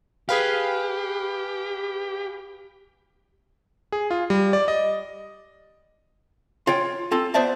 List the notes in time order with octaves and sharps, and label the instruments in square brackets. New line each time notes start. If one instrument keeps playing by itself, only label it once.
[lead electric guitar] G4 [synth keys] G#4 B4 F5
[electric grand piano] G#4
F4
G3
D5
D#5
[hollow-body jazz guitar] F4 C#5 G5
C4 F4 A4
B3 C5 D5 E5 A5